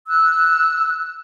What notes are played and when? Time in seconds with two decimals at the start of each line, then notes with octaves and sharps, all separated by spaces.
0.07 E6 F#6